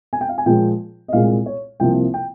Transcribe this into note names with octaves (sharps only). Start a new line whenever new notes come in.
G#5
G5
F5
G#5
A#2 F3 G#3 G5
D#5
C2 A#2 G#3 F5
C#5
C2 C3 F3 A#3 G5
G5